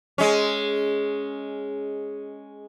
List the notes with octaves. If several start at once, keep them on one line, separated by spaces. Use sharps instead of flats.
G#3 C#4